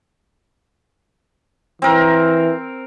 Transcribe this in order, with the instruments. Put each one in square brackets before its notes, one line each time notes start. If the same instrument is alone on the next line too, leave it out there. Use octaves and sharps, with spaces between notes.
[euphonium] E3 [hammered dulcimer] C4 A#4